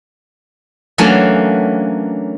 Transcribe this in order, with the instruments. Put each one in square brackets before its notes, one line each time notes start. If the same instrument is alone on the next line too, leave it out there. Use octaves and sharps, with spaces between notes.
[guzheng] E3 F#3 A3 A#3 C#4 D4